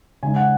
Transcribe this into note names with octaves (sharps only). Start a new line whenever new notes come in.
C#3 G#3 D#4 G#5
F#5